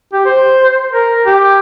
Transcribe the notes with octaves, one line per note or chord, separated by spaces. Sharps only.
G4
C5
A#4
G4